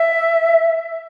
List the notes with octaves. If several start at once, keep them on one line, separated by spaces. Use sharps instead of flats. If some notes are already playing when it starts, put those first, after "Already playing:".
Already playing: E5